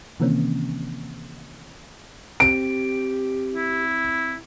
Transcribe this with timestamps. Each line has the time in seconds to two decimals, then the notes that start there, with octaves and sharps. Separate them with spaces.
0.20 C3 D#3 E3 A#3 C4 C#4
2.40 C4 G4 D7
3.54 E4